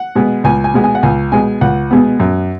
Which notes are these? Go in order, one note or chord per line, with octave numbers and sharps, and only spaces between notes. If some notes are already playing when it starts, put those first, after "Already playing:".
Already playing: F#5
B2 G#3 B3
C#2 G#5
G#5
B2 G#3 B3
G#5
F#5
C#2 G#5
B2 G#3 B3 G#5
C#2 F#5
B2 G#3 B3
F#2